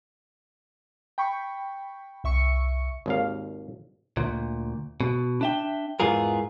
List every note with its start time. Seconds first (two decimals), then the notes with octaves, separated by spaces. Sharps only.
1.18 G5 B5 C#6
2.24 C2 E5 C#6 C#7
3.06 G#1 D#2 F5
4.17 D2 A#2
5.01 B2
5.41 D4 E5 G5
6.00 E2 G#2 E3 F4 G#4 A#4